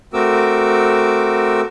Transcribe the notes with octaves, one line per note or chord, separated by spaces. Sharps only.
A3 C4 F#4 A#4 D6 E6